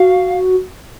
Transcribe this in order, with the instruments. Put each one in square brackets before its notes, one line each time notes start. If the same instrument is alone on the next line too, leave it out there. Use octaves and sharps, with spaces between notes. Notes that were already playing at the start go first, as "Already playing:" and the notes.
Already playing: [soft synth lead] F#4 [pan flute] F5